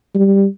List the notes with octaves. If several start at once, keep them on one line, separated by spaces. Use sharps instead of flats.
G3